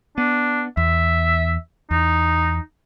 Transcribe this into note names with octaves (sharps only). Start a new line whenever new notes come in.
B3 D4
E2 E5
E2 D#4